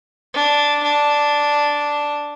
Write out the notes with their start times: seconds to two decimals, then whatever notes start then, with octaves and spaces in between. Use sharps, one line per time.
0.34 D4
0.83 D4